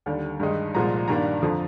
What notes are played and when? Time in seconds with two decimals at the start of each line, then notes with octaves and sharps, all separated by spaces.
0.06 D#2 D3 G3
0.40 G2 D#3 G#3 D#4
0.75 C2 A#2 F3 G#3 A#5
1.08 G2 D#3 G3 A#3 D4 A#5
1.42 F2 D3 F3